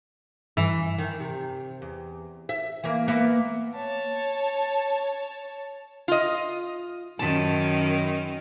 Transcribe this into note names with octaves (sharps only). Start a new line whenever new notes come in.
G2 E3
D#3
C3
E2
E5
E3 A#3
A#3 B3 E5
C#5 A5
F4 D#5
F#2 D#3 C#4 A5